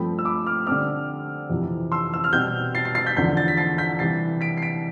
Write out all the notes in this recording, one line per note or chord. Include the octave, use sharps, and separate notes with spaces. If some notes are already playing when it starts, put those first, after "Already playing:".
Already playing: G2 F3 A3 C4 G5 B5
E6
B5 D6
D6 F6
D3 G3 C4 D6 F6
F2 C3 E3
C6 E6
E6
F6
B2 G3 C4 E6 G6
A6 C7
A6 C7
A6 C7
G6 B6
E2 D3 F3 G6 B6
A6
B6
A6 C7
G6 B6
C3 E3 G3 A6 C7
B6 D7
C7
B6 D7